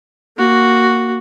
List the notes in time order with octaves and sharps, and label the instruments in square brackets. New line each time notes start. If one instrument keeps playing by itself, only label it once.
[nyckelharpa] A#3 F#4